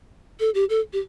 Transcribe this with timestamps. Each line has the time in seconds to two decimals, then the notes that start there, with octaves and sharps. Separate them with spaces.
0.40 A4
0.55 G4
0.70 A4
0.93 G4